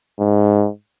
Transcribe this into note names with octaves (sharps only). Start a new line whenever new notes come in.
G#2